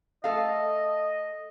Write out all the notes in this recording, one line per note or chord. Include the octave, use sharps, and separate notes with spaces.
A3 A4 D#5 F5